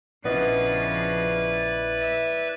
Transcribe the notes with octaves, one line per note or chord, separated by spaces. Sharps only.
A#1 C#3 F3 B3 E4 B4 D5 D#5
E5